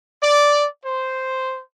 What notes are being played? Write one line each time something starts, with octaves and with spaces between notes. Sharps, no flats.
D5
C5